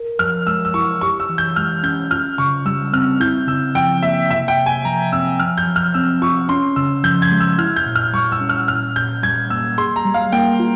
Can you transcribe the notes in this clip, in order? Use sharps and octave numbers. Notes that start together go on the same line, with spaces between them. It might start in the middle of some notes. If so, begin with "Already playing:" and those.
Already playing: A#4
F3 F6
G#3 E6
E6
E4 C#6
G4 C#6
E6
E3
G6
G#3 F6
C#4 G6
F4 F6
C#3 C#6
G3 E6
C4 F6
E4 G6
C#3 E6
F3 G5
A#3 E5
C3 E5
G5
C3
G#5
F3 A#5
C4 E6
F3 F6
G6
F3
F6
C4 E6
F4 C#6
C#4 C6
C#3 E6
F3 G6
G#6
G#3
E6
E4 F6
G6
A#2
F6
G3 C#6
E6
C#4
F6
A#2 F6
A#2 G6
G3 G#6
A#3 E6
G#4 C6
A#5
G3
F5
A#3 G5
F4